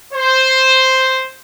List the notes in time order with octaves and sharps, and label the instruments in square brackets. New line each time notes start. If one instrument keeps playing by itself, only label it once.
[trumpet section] C5